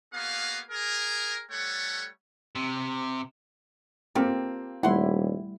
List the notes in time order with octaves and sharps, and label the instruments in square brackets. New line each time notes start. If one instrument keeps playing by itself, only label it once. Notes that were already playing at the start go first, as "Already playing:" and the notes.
[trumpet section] A#3 B3 F#4 G#4 F5
G#4 A#4
G3 A3 A4 C#5 F#5
[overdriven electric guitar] C3
[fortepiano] A#3 C4 [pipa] F4 G4 A4
[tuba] D#1 [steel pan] G3 A3 E4 [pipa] F#5 C6